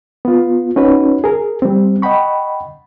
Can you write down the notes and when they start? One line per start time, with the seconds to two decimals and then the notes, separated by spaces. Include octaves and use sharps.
0.25 B3 F4
0.76 C#4 D#4 F#4 B4 C#5
1.24 G#4 A#4
1.62 G3 C4
2.02 D#5 F#5 G5 B5 C#6